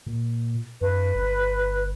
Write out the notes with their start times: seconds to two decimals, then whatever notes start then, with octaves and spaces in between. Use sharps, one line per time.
0.06 A#2
0.81 F#2 B4
1.15 G1